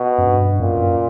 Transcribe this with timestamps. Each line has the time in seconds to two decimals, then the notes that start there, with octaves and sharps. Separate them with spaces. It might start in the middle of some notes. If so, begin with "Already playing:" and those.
Already playing: B2
0.18 F#2
0.27 G2
0.60 F#2 A#2